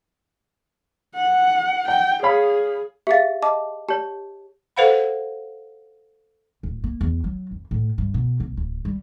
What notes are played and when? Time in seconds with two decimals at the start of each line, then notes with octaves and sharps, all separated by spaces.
1.15 F#5
1.88 F#5 G5
2.23 G#4 C#5 F5 B5
3.07 G4 G#4 E5 F5 A6
3.42 D#5 A5 D6
3.89 G4 C#5 A5
4.77 A4 B4 C5 F5 F#5 B5
6.63 D1
6.84 A#3
7.01 E2
7.24 F#3
7.51 F2
7.71 A2
7.98 G2
8.14 B2
8.40 B1
8.57 D1
8.85 G3